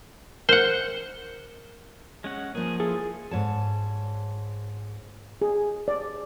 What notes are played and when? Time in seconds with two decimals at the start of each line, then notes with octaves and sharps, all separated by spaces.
0.49 A#4 C5 F#5
2.24 G#3 C#4 F#5
2.55 F3 A#3 G#4
2.80 E4 F4 G#4 A4
3.31 G#2 C#5 A5
5.42 G#4
5.88 D5